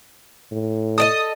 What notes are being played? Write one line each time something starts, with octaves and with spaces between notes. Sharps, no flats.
A2
A4 D5 D#5 D#6